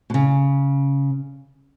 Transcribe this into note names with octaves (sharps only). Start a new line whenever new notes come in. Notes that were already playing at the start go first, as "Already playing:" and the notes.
B2
C#3